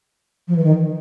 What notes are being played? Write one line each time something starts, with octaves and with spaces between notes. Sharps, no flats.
F3
E3
D#3